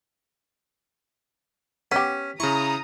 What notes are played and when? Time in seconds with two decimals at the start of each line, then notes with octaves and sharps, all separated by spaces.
1.92 B3 C#4 G4 B6
2.40 C#3 E4 A#5 C#6 D#6